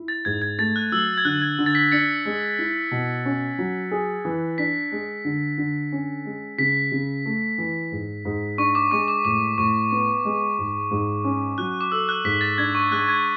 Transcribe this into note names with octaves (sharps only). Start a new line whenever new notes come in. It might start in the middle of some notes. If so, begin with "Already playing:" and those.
Already playing: E4
A6
G#2 G#6
G#6
A3 A6
F#6
F#3 E6
G#6
D3 F#6
G#6
D3
A6
B6
D4 A6 C#7
G#3
E4
B2
C#4
F#3
G#4
E3
D4 B6
G#3
D3
D3
C#4
G#3
C#3 B6
C#3
A3
E3
G#2
G#2
D4 C#6
D6
G#3 C#6
D6
A2 D6
A2 C#6
B3
G#3
G#2
G#2
C#4
F#3 F#6
D6
A4 E6
F#6
G#2 B6
A6
D4 G#6
C#6
G#3 F#6
G#6